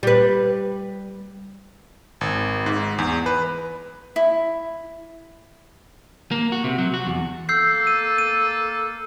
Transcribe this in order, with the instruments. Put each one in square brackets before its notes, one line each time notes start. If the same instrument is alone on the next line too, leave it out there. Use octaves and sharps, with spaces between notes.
[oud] G3 B4
[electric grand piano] G#1
G#2
E2
B4
[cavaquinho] E4
[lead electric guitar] A#3
F#4
C3
F#3
F#4
E2
[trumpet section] A#3 A4 [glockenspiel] E6 G6 C7
[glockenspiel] D#7
D#7